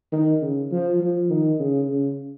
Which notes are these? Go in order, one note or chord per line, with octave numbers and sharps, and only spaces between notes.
D#3
C#3
F3
F3
D#3
C#3
C#3